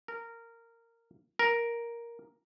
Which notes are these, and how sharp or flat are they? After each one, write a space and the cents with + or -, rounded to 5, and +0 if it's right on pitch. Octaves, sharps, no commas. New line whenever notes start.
A#4 -15
A#4 +5